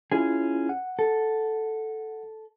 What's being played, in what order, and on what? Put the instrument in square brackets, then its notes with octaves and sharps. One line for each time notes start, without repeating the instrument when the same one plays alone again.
[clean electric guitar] C#4 G#4 [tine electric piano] E4 F4
[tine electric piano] F#5
[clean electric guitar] A4